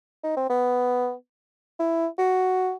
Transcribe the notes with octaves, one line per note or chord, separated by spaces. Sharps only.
D#4
C4
B3
E4
F#4